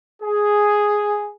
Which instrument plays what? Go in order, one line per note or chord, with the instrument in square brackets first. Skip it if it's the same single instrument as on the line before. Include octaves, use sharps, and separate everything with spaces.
[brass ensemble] G#4